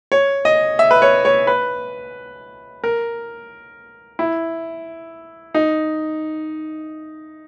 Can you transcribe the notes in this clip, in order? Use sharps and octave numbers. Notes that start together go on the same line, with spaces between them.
C#5
D#5
E5
B4
C#5
C#5
B4
A#4
E4
D#4